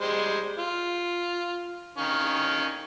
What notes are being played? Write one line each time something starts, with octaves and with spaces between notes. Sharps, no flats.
G3 G#3 C5
F4
D#3 C#4 F5